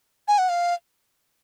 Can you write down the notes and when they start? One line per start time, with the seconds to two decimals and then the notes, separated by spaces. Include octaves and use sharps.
0.28 G#5
0.38 F#5
0.49 F5